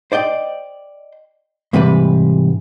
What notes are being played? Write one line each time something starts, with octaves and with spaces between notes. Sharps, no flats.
C5 D5 D#5 G5
G#2 C3 E3 G3 B4 B5